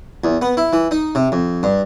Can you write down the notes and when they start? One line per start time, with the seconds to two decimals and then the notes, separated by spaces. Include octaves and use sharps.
0.24 E2
0.42 B3
0.57 E4
0.73 E3
0.91 D#4
1.15 C3
1.32 F2
1.63 G2